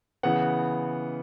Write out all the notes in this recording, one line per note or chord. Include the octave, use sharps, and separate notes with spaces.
C#3 E3 B3 F#5